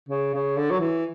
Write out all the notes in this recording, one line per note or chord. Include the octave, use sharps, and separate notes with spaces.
C#3
C#3
D3
F#3
E3